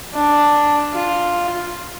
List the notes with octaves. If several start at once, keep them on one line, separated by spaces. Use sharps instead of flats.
D4
F4